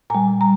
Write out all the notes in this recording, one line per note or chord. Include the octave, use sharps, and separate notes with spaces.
A#2 G3 G#5 A#5
A#5